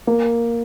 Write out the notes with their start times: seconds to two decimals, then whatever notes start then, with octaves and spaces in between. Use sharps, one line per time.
0.07 A#3